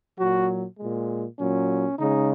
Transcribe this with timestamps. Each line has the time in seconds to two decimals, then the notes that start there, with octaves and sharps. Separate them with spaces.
0.17 A#2 F#3 F#4
0.77 A#2 G#3
1.38 A#2 F#3 C#4
1.98 C#3 G#3 D#4